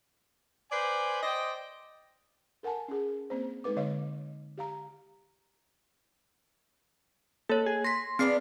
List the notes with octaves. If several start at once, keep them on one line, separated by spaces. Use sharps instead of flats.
B4 C5 D5 G#5
C5 D5 D#5 G5
A4 A#4 F#5 G#5 A5
C#4 G#4
A#3 C4 C5
G#3 D#4 A4 B4 D6
D3 C#5 D#5 F5
G4 F5 A#5
A#3 A4 C#5
G#4
C6 A#6 B6
B3 C4 D4 G#4 C7